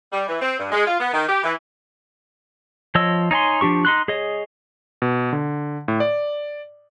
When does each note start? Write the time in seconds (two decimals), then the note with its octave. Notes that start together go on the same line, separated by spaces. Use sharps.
0.12 G3
0.28 E3
0.41 C4
0.59 G2
0.72 G#3
0.87 F4
1.00 B3
1.13 D#3
1.28 G4
1.43 E3
2.95 F3 C#5 D#5 E6
3.31 D#4 C#5 G#5 C6
3.61 F3 D4 G4 C#6
3.85 D#4 C6 F#6
4.08 G#4 C#5 D#5
5.02 B2
5.33 D3
5.88 A2
6.00 D5